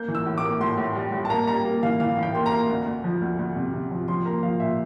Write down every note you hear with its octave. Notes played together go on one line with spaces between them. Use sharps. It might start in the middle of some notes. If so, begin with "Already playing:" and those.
Already playing: A#3 G6
E3
E6
A2
D6
A#3
A2 C6
A2
G3
A2
A5
A#3 A#5
G3 A#5
A#3
E3 F5
E3 F5
A2
G5
A#3 C6
A#5
A#3
D2
D2
F3
D2
D2
C3
C3
F3
F3 C6
A#3 A#5
F3 F5
A#2 E5